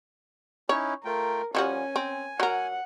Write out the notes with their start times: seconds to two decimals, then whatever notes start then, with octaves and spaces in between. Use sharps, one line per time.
0.69 C#4 D#4 E4 C#5
1.05 A3 F4 A#4 G5
1.55 F3 G3 C#4 F#4 G#5
1.96 C4
2.40 F#3 A#4 F#5